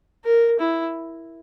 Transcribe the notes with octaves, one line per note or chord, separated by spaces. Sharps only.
A#4
E4